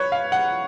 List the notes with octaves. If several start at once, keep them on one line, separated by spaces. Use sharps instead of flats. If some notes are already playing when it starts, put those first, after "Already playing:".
Already playing: B4 C#5
F5
F#5